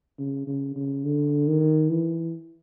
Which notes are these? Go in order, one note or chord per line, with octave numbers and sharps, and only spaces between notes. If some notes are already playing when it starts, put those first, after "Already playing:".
C#3
C#3
C#3
D3
D#3
E3